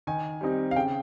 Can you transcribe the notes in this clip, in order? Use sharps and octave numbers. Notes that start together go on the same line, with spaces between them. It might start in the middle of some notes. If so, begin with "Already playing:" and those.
D#3 G#5
G3 C4 D#4
F5
C#3 G5